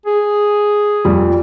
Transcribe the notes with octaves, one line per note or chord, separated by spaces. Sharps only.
G#4
F2 G3